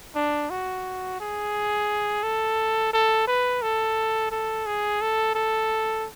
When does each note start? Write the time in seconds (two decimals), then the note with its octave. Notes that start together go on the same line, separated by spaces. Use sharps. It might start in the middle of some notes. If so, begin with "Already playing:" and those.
0.15 D4
0.50 F#4
1.20 G#4
2.23 A4
2.93 A4
3.27 B4
3.62 A4
4.31 A4
4.66 G#4
5.01 A4
5.35 A4